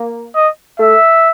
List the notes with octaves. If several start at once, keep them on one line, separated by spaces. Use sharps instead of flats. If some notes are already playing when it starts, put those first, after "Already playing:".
Already playing: A#3
D#5
A3 E5